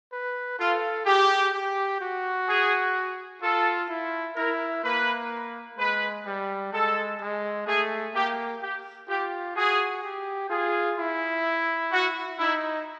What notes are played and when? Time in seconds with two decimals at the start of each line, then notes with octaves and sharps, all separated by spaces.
0.12 B4
0.59 F4 A4
1.06 G4 G#4
1.53 G4
2.01 F#4
2.47 G#4
3.42 F4 A4
3.89 E4
4.36 E4 A#4
4.84 A#3 B4
5.78 G#3 B4
6.25 G3
6.72 G#3 A4
7.20 G#3
7.67 A3 G#4
8.14 A#3 G4
8.61 G4
9.08 F4 G4
9.56 F#4 G#4
10.03 G4
10.50 F4 G#4
10.98 E4
11.92 F#4
12.38 D#4 E4